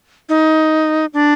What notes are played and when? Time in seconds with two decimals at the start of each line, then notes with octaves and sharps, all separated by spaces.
0.29 D#4
1.14 D4